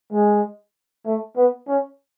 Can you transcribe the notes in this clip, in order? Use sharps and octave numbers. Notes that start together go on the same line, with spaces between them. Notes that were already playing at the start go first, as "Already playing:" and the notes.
G#3
A3
B3
C#4